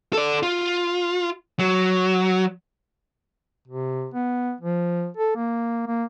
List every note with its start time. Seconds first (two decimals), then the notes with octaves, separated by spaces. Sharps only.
0.13 A4 D5
0.43 F4
1.59 F#3
3.68 C3
4.14 B3
4.61 F3
5.17 A4
5.36 A#3
5.87 A#3